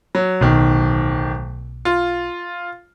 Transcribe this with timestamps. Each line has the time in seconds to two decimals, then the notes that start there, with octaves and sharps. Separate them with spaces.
0.15 F#3
0.41 D1 B1 D#3
1.85 F4